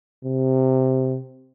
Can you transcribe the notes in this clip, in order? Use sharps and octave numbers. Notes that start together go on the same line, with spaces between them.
C3